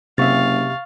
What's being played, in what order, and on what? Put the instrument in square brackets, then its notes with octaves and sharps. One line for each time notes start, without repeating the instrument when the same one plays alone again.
[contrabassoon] F#1 [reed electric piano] C3 G4 E5 [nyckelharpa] F5 [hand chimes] C#6 A6